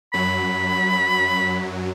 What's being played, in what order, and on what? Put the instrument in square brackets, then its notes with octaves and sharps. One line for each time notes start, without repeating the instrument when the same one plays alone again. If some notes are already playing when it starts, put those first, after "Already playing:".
[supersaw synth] F#2 F#3 [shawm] B5